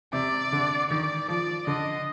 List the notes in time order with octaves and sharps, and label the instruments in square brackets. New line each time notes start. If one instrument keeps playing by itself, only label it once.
[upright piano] C3 [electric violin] D5
[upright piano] D3
[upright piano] D#3 [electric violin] D5
[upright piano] F3 [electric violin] D5
[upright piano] D3 [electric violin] D#5